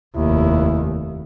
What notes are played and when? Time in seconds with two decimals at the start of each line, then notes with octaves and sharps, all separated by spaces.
0.16 F1 D#2 E4